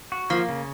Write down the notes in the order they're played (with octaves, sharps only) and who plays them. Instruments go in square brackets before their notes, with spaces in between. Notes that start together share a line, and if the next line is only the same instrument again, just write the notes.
[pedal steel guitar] F#4
[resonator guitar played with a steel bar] F3 [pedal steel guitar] A#3
[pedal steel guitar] C#3